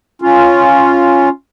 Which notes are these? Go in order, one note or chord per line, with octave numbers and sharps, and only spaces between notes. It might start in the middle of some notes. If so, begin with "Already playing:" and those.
C#4 F4